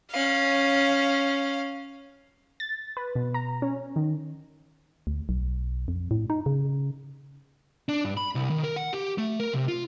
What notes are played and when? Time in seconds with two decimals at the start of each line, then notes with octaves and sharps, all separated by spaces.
0.11 C#4 F5
2.60 A6
2.97 B4
3.15 B2
3.34 A#5
3.62 C#4
3.96 D#3
5.07 D2
5.29 B1
5.88 F2
6.11 A2
6.30 D#4
6.46 C#3
7.89 D4
8.05 G2
8.17 B5
8.35 C2
8.50 D#3
8.64 A#4
8.76 F#5
8.93 G4
9.18 A3
9.40 A#4
9.53 C3
9.68 F4